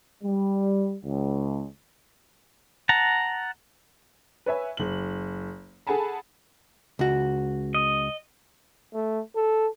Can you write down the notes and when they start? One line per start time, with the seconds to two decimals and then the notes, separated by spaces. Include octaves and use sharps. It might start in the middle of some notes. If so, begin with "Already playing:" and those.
0.24 G3
1.04 C#2
2.89 F#5 A5 A#5
4.46 B4 C#5 E5 G#5
4.77 F#1 F#7
5.87 G#4 A4 F#5 G#5 A5 B5
6.99 C#2 F#4
7.75 D#5
8.94 A3
9.36 A4